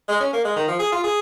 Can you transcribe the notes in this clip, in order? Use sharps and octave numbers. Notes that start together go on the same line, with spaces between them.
G#3
C#4
A#3
G#3
D#3
F3
G#4
F4
G#4